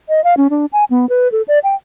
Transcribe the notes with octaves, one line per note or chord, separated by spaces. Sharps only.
D#5
F5
C#4
D4
G#5
B3
B4
A4
D5
G5